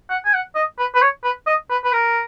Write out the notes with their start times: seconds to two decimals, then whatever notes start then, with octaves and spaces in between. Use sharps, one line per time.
0.10 F#5
0.25 G#5
0.34 F#5
0.55 D#5
0.79 B4
0.95 B4
1.02 C#5
1.24 B4
1.47 D#5
1.70 B4
1.84 B4
1.93 A#4